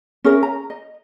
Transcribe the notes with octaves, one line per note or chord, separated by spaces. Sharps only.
C#4 G#4 A#4 E5
A#5
D#5